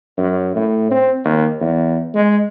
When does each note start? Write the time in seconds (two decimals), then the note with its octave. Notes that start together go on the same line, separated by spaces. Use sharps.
0.18 F#2
0.55 A2
0.91 C4
1.25 D#2
1.60 E2
2.15 G#3